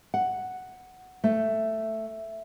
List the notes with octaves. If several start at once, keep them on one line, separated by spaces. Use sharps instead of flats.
F#5
A3